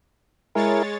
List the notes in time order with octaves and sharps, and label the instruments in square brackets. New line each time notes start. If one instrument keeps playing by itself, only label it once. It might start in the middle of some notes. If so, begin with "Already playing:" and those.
[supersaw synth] G#3 C#5 A6 [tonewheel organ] E4 G#4 A#4